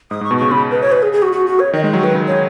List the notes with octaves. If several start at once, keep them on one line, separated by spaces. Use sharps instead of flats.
G#2 D#6
G#2 C#6
B2
C#3 C#6
C#3 B5
B4
C#5
B4
G#4
G#4
F#4
F#4
F#4
C#5
D#3 D#5
G#3 D#4
F#3 F#4
D#3 B4
C#3
D#3
C#3 C#5